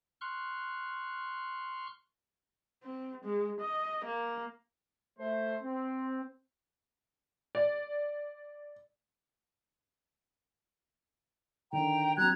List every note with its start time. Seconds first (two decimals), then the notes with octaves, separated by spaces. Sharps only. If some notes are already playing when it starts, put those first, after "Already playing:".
0.21 C6 C#6 F6 F#6
2.83 C4
3.25 G#3
3.60 D#5
4.05 A#3
5.19 A3 C5
5.63 C4
7.55 D5
11.72 D3 D#3 G5 A#5
12.17 F#3 C4 A#5 F#6 G#6